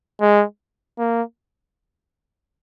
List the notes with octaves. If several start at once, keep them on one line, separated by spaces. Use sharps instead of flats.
G#3
A#3